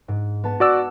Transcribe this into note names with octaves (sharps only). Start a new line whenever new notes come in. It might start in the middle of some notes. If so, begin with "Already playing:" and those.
G#2
B3 A5
F#4 D5 F#5 D6 E6